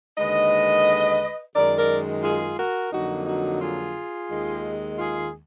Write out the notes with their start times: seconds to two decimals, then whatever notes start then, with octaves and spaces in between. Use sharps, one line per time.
0.18 D#2 D3 G#3 B4 D#5
1.54 F#2 D#3 G#3 A#4 D5
1.77 A#4 D5
2.23 F4 G#4
2.57 F#4 A#4
2.92 F2 D3 F#3 A#3 D#4 F#4
3.26 D#4 F#4
3.61 F4 G#4
4.28 D#2 D#3 G#3
4.97 F4 G#4